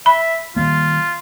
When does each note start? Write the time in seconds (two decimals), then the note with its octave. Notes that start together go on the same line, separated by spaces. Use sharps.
0.06 E5 B5
0.56 D#3 G3 A#3 F4